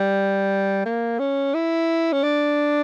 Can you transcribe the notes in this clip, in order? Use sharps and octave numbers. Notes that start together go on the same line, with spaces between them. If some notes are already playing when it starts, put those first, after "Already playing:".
Already playing: G3
A#3
C#4
E4
C#4
D4